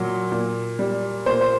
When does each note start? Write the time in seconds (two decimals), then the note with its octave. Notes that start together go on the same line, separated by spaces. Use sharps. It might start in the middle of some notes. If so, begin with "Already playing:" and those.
Already playing: A#2 F#3
0.32 A#2
0.79 G3
1.26 A#2 C5
1.41 C5